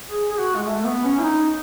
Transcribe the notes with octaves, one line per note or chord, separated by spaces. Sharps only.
G#4
G#4
F#4
G#3
A3
B3
C#4
E4
D#4